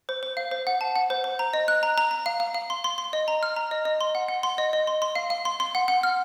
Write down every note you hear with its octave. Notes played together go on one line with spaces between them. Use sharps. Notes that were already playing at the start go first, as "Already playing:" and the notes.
C5
C5
F5
C5
F#5
A5
F#5
C5
C5
A#5
D#5
F#6
A#5
A#5
A#5
F5
F5
F5
C6
C6
C6
D#5
A#5
F6
A#5
D#5
D#5
C6
F#5
F#5
C6
D#5
D#5
C6
C6
F5
F5
C6
C6
F#5
F#5
F6